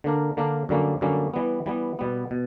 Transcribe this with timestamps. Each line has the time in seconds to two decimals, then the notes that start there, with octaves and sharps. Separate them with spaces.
0.04 D3 A#3 D4 A#4
0.37 D3 A#3 D4 A#4
0.69 F#2 D3 G3 A#3 C#4
1.01 F#2 D3 G3 A#3 C#4
1.34 E3 G3 B3
1.66 E3 G3 B3
1.99 B2 G3 B3
2.31 B2